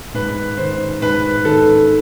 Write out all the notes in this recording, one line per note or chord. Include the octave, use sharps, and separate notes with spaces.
G#2 B4
D#3 C5
G#2 B4
D#3 A4